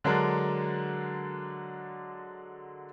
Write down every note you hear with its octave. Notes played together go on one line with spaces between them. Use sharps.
D3 F#3 G#3 D4 A#4